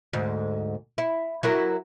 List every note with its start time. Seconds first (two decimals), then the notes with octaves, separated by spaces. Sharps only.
0.13 D2 G#2
0.98 E4
1.43 F#3 E4 A#4